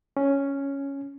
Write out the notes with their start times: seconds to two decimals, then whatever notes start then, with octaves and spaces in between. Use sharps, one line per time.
0.17 C#4